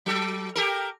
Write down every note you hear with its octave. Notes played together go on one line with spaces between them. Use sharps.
F#3 A4
G4 A4 A#4